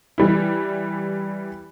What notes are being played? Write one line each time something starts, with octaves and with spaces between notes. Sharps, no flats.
E3 G3 E4